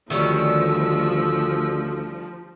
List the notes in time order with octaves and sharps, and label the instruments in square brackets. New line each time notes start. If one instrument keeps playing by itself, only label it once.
[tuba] D2 [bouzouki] D#3 G3 C#4 [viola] F3 [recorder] E6